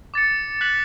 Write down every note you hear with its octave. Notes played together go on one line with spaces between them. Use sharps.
D6 A6 C#7
F#6 B6 F#7